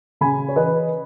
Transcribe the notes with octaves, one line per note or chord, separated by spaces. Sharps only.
C#3 G#5 B5
C#5
E3 B4 D#5